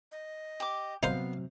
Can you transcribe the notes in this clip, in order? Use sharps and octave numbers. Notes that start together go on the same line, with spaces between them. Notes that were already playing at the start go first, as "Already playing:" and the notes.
D#5
G4 D6
C3 F#3 B3 D#4 C5 F5